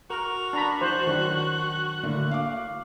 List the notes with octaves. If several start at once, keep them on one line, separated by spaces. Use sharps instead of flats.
F#4 A#4 F7
D4 A#5 B5
E3 C5 F#6
D#3 F#3 D4
A2 D3 A#3
F5 D6